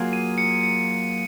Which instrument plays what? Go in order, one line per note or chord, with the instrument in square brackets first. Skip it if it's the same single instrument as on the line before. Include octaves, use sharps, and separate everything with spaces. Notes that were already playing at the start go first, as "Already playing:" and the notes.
Already playing: [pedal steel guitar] F#3 A#3 F4 G#4
[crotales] D#7
C#7
C#7